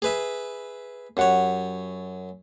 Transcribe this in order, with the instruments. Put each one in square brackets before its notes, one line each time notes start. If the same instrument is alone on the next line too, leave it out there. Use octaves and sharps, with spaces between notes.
[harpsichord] G#4 B4 E5
[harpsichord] F#2 C#5 [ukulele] G4 F#5